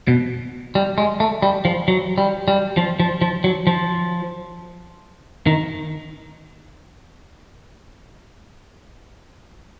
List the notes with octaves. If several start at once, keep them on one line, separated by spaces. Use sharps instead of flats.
B2
G3
G#3
A3
G3
F3
F#3
G3
G3
F3
F3
F3
F#3
F3
D#3